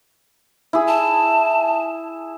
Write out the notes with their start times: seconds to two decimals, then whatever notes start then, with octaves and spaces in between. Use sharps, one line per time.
0.73 E4 G#4
0.88 A5